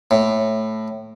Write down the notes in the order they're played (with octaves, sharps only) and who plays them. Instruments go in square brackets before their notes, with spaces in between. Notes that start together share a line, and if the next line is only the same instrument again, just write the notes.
[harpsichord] A2